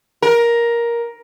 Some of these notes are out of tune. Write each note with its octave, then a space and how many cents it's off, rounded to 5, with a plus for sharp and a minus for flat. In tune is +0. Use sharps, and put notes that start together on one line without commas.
A#4 +10